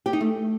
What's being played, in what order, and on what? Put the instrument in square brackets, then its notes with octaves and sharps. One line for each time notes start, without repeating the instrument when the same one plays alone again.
[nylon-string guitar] G4
D#4
A3